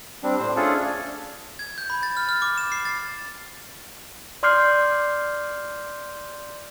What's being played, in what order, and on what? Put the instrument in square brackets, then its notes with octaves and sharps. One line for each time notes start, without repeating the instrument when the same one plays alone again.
[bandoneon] G3 C4 D4
A2 C5
A3 C#4 D4 F4 G#4 A4
[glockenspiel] G#6
G6
B5
A6
F6
F6
D6
E7
C7
A6
[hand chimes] D5 C6 D6 F6 G6 C7